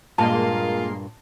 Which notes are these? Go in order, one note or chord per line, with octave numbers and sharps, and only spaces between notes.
G2 A#2 G#3 A#3 F4 A5 C6